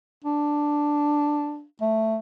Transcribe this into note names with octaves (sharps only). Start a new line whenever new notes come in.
D4
A3